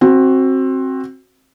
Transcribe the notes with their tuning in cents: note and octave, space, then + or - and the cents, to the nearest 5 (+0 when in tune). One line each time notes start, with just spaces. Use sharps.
C4 +20 F#4 +0